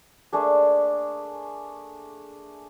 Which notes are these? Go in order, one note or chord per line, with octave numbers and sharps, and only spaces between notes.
A3 A#3 D4 G#4